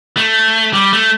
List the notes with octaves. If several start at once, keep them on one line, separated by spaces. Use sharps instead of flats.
A3
G3
A3